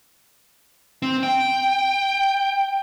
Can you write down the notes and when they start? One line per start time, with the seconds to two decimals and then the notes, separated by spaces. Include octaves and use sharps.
1.02 C4
1.23 G5